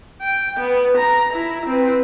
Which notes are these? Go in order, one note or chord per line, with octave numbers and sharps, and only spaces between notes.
G5
B3
A#5
E4
C4 B4